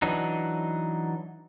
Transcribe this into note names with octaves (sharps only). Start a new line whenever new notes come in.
E3 F#3 D4 D#4